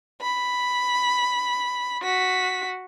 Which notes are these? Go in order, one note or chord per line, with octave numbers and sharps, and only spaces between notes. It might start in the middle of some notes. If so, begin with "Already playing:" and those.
B5
F#4 B6